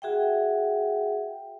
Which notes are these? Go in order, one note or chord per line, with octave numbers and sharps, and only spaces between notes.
F#4 G#4 E5 F#5 G5